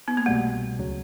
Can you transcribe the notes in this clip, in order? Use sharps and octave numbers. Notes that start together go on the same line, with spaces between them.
B3
A#3
C2 B2 G3 A3
D2 C#3 F#3